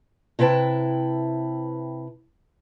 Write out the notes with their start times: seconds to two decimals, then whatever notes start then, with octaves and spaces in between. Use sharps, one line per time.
0.39 C3 E4 B4 G5 A5